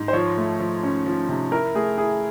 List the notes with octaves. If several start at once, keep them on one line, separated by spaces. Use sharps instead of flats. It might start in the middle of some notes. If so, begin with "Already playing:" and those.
Already playing: G#2
C5
F3 C#5
A3
F3
C#4
F3
C3
E4 A#4
A3 G#4
E4 G#4